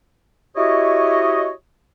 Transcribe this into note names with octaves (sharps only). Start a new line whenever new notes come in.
E4 F#4 G4 C#5 D#5